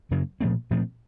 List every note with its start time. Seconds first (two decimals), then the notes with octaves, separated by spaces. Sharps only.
0.11 F#2 C#3 F#3 A#3
0.41 A#2 F3 A3 C4
0.71 A#2 F3 A3 C4